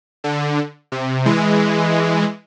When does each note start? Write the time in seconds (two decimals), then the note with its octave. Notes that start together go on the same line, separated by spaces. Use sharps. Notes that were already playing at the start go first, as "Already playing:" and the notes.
0.24 D3
0.92 C3
1.25 E3 G#3